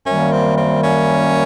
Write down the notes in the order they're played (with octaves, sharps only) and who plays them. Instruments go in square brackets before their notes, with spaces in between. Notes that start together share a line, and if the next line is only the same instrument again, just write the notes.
[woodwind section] F#2 D#3 G3 A#3 [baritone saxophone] C#4
[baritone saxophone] C4
C4
C#4